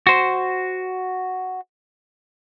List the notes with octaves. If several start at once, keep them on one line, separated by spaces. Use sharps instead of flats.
F#4 C5